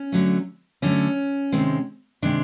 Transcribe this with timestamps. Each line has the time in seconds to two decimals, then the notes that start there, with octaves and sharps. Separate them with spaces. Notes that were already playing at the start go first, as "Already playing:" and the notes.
Already playing: C#4
0.12 D3 F#3 A3
0.82 D3 F#3 A3 C#4
1.52 C3 D#3 G#3 C4
2.22 C3 D#3 G#3 C4 D4